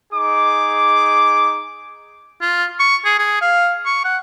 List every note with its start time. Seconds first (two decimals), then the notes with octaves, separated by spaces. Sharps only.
0.13 D#4 G#4 D6
2.41 F4
2.80 C#6
3.05 G#4
3.19 G#4
3.42 F5
3.86 C#6
4.04 F#5